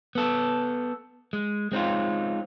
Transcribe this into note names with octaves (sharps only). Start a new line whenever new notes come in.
B3 A4
G#3
G#3 C4 D#4 F4